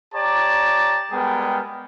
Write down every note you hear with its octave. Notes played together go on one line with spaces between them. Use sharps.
G4 C#5 D5 A5 A#5
G3 G#3 B3 G#4 A#4 G5